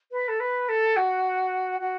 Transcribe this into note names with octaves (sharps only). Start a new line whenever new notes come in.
B4
A4
B4
A4
F#4
F#4